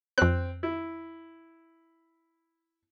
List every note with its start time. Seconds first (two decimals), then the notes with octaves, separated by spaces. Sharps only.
0.18 F2 C4 F#6
0.63 E4